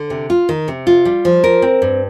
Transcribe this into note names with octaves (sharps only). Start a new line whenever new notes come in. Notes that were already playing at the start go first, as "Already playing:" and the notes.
Already playing: D3
C3
F4
D#3
C3
F4
G3
F3
A#4
C4
G2